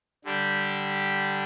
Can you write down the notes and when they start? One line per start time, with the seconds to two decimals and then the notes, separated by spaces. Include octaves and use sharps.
0.24 D3 G3 D4 G4